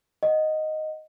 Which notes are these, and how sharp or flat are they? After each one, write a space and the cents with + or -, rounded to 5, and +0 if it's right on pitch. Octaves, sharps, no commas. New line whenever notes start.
D#5 +0 F#5 +0